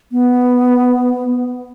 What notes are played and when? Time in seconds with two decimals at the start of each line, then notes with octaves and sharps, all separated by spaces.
0.12 B3